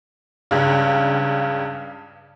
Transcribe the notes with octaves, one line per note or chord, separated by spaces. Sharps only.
C#2 G2 C#3